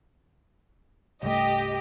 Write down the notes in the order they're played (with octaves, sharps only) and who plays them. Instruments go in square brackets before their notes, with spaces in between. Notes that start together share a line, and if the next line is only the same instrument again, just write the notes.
[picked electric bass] C2 G2 A3 [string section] G4 D#5